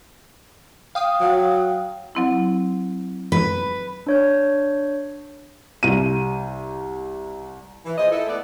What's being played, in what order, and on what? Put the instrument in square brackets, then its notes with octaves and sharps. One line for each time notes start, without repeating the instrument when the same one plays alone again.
[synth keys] F5 G5 D#6
[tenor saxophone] F#3
[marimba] F#3 C4 E4
[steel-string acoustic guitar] B4
[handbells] D4 C#5 G6
[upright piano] C2 D#7
[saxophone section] E3
A#2 G#4 C5 D#5
E4 A4
A3 B3 D5